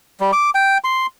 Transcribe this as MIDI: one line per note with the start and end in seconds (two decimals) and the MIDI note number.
0.20 0.31 55
0.33 0.50 86
0.55 0.78 79
0.84 1.06 84